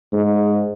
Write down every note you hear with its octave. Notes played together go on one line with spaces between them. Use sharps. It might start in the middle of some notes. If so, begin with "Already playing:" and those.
G#2